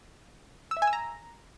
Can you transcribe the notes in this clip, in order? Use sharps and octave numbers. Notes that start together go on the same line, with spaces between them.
E6
E5
G#5
E6
A#5